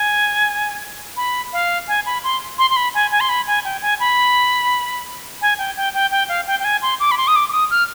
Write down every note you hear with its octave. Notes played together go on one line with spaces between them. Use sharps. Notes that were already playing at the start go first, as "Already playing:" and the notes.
Already playing: G#5
B5
F5
G#5
B5
C6
C6
C6
B5
G#5
G#5
C6
B5
G#5
G5
G#5
B5
G#5
G5
G5
G5
G5
F5
G5
G5
G#5
C6
D6
B5
C6
D#6
D6
D6
D#6
F6